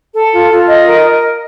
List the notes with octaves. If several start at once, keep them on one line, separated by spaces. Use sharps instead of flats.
A4
F4
F4
D#5
A#4